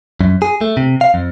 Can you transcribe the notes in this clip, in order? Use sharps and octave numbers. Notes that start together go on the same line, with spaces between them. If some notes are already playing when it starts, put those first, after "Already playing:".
F#2
G#4
A3
C3
F5
F2